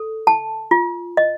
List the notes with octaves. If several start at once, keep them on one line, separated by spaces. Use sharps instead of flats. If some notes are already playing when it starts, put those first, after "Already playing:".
Already playing: A4
A5
F4
D#5